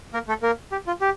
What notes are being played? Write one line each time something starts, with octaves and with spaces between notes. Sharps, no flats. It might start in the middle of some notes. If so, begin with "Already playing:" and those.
A#3 A#4
A3 A4
A#3 A#4
G4
F4
G4